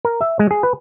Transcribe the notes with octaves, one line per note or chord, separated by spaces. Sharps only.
A#4
E5
G#3
G#4
B4